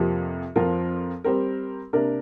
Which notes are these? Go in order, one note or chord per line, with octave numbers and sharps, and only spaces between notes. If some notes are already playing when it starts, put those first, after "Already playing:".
Already playing: F2 C3 F3 A#3 G4
F2 F3 C4 F4 A#4
G3 C4 A#4
C3 A#3 D4 A#4